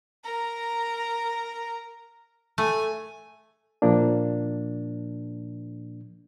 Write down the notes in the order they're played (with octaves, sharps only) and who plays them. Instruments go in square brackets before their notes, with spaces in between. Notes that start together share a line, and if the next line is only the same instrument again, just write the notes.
[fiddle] A#4 A#5
[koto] A3 [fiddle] G#5
[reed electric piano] A#2 F3 A#3 D4